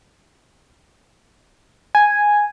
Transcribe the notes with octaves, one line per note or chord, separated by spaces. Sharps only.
G#5